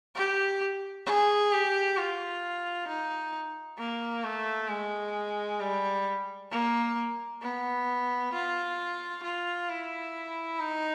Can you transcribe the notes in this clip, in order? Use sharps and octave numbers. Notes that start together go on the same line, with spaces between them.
G4
G#4
G4
F4
D#4
A#3
A3
G#3
G3
A#3
B3
F4
F4
E4
D#4